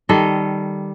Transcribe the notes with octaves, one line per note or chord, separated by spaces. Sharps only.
D#3 G3 A4 D#5